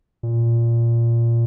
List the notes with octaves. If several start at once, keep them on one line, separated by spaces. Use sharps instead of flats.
A#2